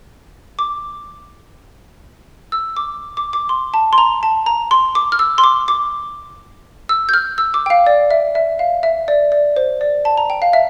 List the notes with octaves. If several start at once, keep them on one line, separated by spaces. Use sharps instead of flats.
D6
E6
D6
D6
D6
C6
A5
C6
A#5
A5
A#5
C6
D6
F6
E6
C6
D6
D6
E6
G6
F6
E6
D6
G5
F5
D5
E5
E5
F5
E5
D5
D5
C5
D5
A5
A#5
G5
F5
E5